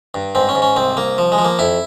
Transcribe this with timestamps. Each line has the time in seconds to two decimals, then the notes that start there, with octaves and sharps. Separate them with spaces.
0.14 G2
0.35 G#2 C4
0.49 C#4
0.55 G#2
0.62 C#4
0.76 C2 C4
0.97 C2 A#3
1.18 F3
1.32 G#3
1.38 F3
1.45 A#3
1.59 F2 E4